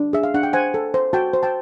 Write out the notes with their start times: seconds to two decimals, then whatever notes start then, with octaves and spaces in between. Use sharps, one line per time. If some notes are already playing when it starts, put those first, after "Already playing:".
Already playing: D4
0.13 G#4 E5
0.24 F5
0.34 D4 F#5
0.43 G5
0.53 C5 F#5 G#5
0.74 A4
0.94 C5
1.13 F#4 G5 A5
1.33 C5
1.43 G5 A5